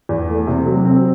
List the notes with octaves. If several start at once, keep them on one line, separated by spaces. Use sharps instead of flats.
E2
A3
C3
F#3
C4